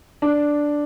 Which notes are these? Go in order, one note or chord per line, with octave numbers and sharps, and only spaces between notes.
D4